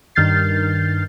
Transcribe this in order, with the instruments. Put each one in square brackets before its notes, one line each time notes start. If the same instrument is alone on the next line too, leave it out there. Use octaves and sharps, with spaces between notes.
[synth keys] G2 D#3 F6 G6 A6 C7